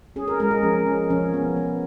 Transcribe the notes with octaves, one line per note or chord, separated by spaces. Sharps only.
C#4 G#4
A#4
G#3 A#4
G#4
F3 C#4
C#4
F3 C#4
B3
B3